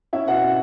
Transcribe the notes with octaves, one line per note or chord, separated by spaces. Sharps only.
C#4 E4 E5
B2 F#4 F#5
B2